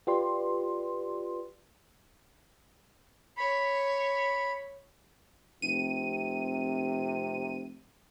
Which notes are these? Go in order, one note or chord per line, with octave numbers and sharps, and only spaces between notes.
F4 G4 B4 D5 C6
C#5 B5
F1 C3 D#7